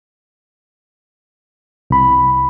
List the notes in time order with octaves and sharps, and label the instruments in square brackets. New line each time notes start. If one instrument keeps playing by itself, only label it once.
[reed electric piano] C2 B5